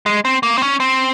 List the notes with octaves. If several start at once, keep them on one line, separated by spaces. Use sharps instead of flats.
G#3
C4
A#3
C4
C#4
C4